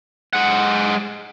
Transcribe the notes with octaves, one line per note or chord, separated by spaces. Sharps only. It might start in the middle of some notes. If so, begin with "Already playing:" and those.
G#3 F#5